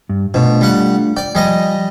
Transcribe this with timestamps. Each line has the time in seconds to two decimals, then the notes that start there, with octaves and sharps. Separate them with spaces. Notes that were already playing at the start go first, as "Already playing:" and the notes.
0.09 G2
0.34 B2 A3 D4 F4
0.61 G3 F#5
1.17 D5 G5
1.35 F3 G3 D#5 G#5